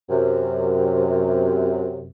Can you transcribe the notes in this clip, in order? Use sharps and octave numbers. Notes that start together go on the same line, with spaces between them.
F#2 C3